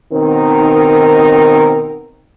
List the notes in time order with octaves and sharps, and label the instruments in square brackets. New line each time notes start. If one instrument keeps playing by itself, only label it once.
[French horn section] B2 D#3 C4 D#4 A#4